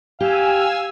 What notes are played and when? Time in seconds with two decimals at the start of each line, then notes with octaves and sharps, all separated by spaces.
0.20 G4 F5 G#5 E6